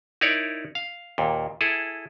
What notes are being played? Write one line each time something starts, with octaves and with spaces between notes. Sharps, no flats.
D#4 E4 A#4 C#5 D5
F5
D#2 A#2
E4 G#4 A4